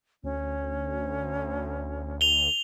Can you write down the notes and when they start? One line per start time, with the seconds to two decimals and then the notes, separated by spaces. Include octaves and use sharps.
0.23 D2 C#4
2.21 F7 G7